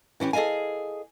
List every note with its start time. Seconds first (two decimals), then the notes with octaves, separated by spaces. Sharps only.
0.20 E3 C#4 E4 G4
0.33 G#4 A4 D#5 F5 G#5